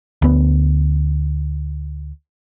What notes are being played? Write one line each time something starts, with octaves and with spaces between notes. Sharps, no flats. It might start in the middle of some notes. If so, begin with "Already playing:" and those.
D2 B3